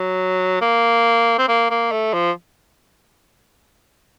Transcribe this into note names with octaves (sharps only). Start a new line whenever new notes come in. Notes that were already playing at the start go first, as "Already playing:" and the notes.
Already playing: F#3
A#3
C4
A#3
A#3
A3
F3